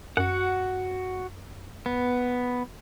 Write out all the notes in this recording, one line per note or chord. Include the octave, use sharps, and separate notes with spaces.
F#2 F#4 F#5
B3